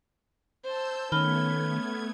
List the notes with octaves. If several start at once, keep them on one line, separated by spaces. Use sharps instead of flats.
C5 A5 E6 G6
D#3 A3 B3 C#4 B5 F6 G#6 G7